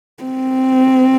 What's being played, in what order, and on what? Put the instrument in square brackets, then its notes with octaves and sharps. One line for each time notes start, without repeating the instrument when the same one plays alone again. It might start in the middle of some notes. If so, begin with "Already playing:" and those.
[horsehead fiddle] C4